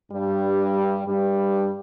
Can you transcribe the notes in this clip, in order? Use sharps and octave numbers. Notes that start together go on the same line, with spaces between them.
G2 G3
G2 G3